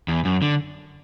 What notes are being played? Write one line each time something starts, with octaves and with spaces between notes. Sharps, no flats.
E2
F#2
D3